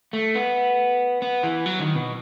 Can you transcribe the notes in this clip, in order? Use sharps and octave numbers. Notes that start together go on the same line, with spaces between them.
A3
B3
B3
E3
F#3
D#3
B2